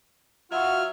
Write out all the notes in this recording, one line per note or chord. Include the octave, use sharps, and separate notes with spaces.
F#3 F4 F#4 E5 F6